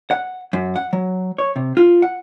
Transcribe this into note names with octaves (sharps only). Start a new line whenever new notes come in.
F#5
F#2
F#5
F#3
C#5
C3
F4
F#5